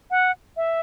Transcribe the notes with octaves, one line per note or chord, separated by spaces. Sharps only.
F#5
E5